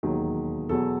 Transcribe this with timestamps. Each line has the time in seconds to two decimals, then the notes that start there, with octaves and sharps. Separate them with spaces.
0.03 E1 D#2 D#3 F#3
0.69 E2 B2 F#3 A4